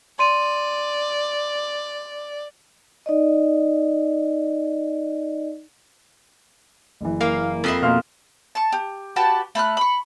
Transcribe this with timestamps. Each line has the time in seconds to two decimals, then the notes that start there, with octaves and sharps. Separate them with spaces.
0.19 D5 C6 D#7
3.06 D#4 D5 D#5
7.01 F#1 E3
7.21 A#3 F5
7.64 F2 D#5 E5 B5 C7
7.82 B2 A#3 F5 C6 F6
8.55 A5 C#6
8.72 G4
9.16 F#4 G4 B4 A5
9.55 A3 B5 F6 F#6
9.77 B5 C#6